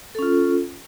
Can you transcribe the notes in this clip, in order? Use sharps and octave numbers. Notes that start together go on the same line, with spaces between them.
C#4 F4 A4